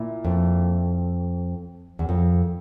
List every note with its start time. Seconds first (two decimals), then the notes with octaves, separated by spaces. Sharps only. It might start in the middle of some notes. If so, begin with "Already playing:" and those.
Already playing: A#2 E4
0.25 F2
1.99 E2
2.09 F2